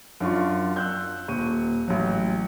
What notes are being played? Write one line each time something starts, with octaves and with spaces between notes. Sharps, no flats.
F#2 D4 F4 C#6
E6 F#6 G6
D#1 C#6 D#7
A1 F#3